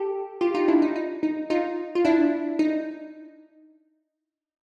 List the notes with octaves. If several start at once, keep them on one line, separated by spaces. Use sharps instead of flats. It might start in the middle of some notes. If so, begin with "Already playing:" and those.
Already playing: G4 A4
F4 G4
D#4 F4
D4 E4
D#4
D#4
D#4
D#4 F4
F4
D4 E4
D#4